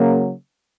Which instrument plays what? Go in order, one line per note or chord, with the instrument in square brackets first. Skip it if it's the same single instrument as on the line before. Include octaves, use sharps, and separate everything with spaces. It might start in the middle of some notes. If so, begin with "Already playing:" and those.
Already playing: [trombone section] C#3 F#3 A#3